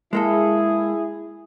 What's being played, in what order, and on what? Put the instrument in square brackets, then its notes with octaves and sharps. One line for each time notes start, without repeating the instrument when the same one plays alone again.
[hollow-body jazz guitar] G#3 A#3 A4 [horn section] E4 G#4